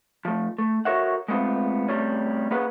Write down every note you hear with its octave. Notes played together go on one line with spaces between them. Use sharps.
F3 A3
A3
F#4 A4 A#4 C#5 E5 F#5
G#3 A3 B3 C4 F4
C3 F#3 G3 A3 C#4
A#3 B3 C#4 G#4 B4 F#5